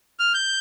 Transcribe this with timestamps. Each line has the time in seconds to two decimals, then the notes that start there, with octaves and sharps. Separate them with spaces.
0.20 F6
0.34 G6